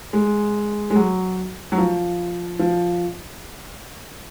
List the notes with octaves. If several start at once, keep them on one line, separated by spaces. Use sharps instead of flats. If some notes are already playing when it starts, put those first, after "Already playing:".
G#3
G#3
F#3
F#3
F3
F3